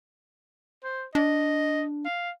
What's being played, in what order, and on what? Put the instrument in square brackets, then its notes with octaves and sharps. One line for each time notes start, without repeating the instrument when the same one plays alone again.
[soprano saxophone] C5
[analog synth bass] D4 [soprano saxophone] D#5
[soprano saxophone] F5